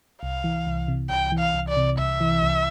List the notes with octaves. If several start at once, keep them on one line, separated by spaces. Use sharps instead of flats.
C2 F5
E3
C2
C3
C2 G5
E3
F5
C2
D5
C3
C2 E5
E3
C2